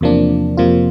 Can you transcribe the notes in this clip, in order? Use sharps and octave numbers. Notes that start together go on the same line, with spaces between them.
E2 C3 F3 A#3 D4
F2 C3 F3 A#3 F4